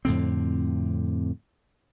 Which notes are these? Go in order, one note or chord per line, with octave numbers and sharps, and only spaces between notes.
F2 A2 D3 C4